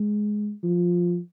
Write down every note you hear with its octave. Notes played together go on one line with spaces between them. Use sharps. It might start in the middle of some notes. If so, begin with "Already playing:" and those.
Already playing: G#3
F3